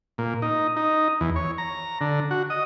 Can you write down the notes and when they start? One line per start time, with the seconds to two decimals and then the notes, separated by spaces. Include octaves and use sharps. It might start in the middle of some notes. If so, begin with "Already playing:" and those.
0.18 A#2
0.42 D#4
0.76 D#4
1.21 E2
1.36 C#5
1.58 A#5
2.01 D3
2.31 F#4
2.50 D#5